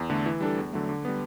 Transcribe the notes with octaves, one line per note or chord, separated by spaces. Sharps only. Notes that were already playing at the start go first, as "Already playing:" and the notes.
Already playing: E2
D3 A3
E3
G3 D4 A4
E2
D3 F#3 A3
D3
G3 B3